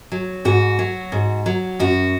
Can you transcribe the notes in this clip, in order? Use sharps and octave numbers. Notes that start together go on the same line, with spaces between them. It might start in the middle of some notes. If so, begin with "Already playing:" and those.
F#3
G#2 F#4
F#3
G#2
F#3
F#2 F#4